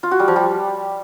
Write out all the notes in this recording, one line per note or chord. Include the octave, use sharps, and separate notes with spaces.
F4
F#4
G3
F3
G3